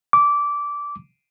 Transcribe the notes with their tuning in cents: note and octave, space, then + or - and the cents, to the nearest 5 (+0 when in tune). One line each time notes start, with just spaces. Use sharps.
D6 -15